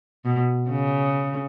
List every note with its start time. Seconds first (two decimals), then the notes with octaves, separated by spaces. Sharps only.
0.25 B2
0.70 C#3